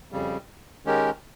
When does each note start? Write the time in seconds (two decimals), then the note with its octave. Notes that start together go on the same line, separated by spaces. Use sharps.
0.12 F2 C#3 G3
0.85 D#3 G#3 C#4 G4 A#4